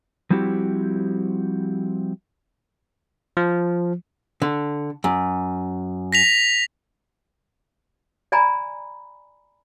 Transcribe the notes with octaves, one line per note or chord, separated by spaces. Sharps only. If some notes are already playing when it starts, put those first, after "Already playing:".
F3 G3 C4 E4 F#4 G4
F3
D3
F#2
A#6 B6 F7
D5 G#5 A#5 B5